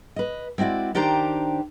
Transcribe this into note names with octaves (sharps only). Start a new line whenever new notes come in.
B4 D#5
G#3 C4 E4 F#4 D5
D#3 D4 G4 C5 A#5